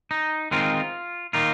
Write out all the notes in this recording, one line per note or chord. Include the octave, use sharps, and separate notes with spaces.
D#4
D#3 G#3 C4 D#4 F4
D#3 A#3 D#4 F4